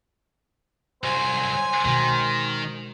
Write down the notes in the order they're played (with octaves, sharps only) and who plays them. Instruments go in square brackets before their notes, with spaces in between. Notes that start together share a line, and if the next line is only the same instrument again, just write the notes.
[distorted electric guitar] C2 F#3 [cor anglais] C5 [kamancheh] G#5
[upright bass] B2 G#3 [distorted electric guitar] D#3